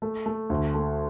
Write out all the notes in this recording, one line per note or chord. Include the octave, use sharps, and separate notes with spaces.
A3
A3
D2
A3